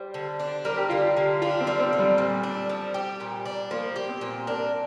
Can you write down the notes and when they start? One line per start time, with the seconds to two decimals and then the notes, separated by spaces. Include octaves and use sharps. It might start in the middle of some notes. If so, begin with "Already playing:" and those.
Already playing: G3 C5
0.14 D3
0.40 D4
0.65 G3 A#4
0.77 G4
0.89 D3 F4
1.02 G4
1.17 D3
1.42 D4 F4
1.61 C4
1.67 G3
1.80 C4
1.93 D3
1.99 G3
2.18 A#2
2.43 D4
2.69 F3
2.94 G4
3.20 A#2
3.46 D4
3.71 F3 A#3
3.96 G4
4.09 C4
4.21 A#2
4.47 D4 A#4